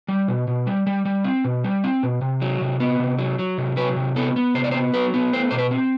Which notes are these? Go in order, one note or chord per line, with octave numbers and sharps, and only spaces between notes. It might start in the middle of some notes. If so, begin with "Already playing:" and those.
G3
B2
B2
G3
G3
G3
C4
B2
G3
C4
B2
C3
F#3
C3
B3
C3
F#3
F#3
C3
F#3 B4
C3
B3 A4
B3
C3 C5
D5
C5
B3
F#3 B4
B3
A3 C5
B2 C5
B4
C4